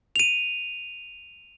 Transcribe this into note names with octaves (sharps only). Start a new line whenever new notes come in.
D#7 F7